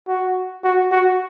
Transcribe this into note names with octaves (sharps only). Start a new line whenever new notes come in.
F#4
F#4
F#4